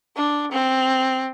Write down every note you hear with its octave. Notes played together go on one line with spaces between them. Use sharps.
D4
C4